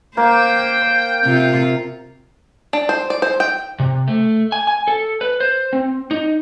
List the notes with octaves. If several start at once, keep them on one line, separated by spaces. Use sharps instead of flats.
A#3 C5 G5
C3 F4
D4
C5
D5
C5
G5
C3
A3
G#5
G#5
A4
B4
C5
C4
D#4